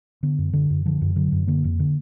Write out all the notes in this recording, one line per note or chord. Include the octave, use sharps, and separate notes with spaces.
D3 B3
F#2
D3
F#2
D3 F3
F#2
D3 F#3
F#2
D3 A#3
F2
D3